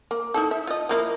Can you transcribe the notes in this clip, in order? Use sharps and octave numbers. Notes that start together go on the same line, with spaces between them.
A#3
D#4 E4 A4
E5
F4 D#5
F3 A#3 E4